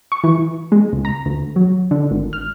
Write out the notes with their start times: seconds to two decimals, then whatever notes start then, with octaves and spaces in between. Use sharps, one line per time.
0.12 C#6
0.24 E3
0.72 G#3
0.93 C#2
1.05 A#5
1.26 D2
1.56 F#3
1.91 D3
2.11 G#1
2.33 F6